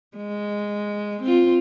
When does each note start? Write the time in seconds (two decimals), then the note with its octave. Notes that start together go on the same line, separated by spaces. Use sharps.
0.17 G#3
1.23 C4 F4